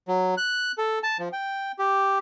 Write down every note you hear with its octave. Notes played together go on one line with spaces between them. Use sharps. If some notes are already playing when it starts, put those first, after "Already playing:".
F#3
F#6
A4
A5
F3
G5
G4